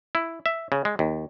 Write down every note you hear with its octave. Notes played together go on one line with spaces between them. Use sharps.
E4
E5
C#3
G#3
D#2